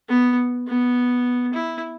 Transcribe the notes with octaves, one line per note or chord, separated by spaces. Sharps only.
B3
B3
E4